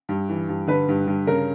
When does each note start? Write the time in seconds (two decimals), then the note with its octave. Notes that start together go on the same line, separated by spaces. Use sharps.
0.09 G2
0.29 E3
0.49 G2
0.67 D3 B4
0.88 G2
1.07 G2
1.27 C#3 A#4